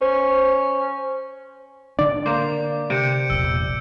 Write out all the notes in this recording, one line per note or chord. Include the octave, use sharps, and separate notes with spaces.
C#4 C5
D3 D4 D5
A#3 C5 D6
C3 G6 C#7 D7
E1 A#1 E6